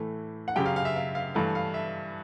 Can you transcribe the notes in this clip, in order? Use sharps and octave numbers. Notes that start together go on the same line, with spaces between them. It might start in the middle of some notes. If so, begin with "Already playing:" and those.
Already playing: A2 E3 A3
F#5
F#2 C#3 F#3 G4 G5
F5
F5
E5
F5
F5
G2 E3 A3 F5
F5
E5